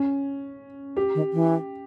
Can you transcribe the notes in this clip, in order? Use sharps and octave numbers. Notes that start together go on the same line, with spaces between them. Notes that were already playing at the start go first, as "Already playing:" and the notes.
Already playing: C#4
G4
D#3
E3